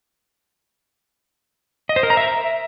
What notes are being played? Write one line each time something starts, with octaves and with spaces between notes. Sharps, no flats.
D#5
C5
A#4
A#5
E5